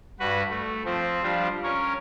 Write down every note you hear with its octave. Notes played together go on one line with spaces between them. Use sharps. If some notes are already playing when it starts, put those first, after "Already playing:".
G2 F#4 B4
A3
F3 C4
F3 G3 D4 F4
C#4 A#4 C#5